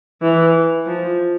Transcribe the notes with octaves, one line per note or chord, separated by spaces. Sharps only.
E3
F3